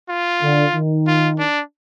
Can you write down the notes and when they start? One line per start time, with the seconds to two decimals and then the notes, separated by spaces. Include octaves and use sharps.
0.09 F4
0.42 D3
0.74 D#3
1.07 F4
1.39 D4